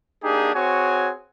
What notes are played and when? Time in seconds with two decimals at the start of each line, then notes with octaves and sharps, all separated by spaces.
0.23 A#3 D4 D#4 G4 G#4
0.55 C4 F#4 G#4 C#5 G#5